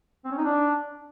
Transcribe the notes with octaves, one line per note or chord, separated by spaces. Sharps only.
C4
C#4
D#4
D4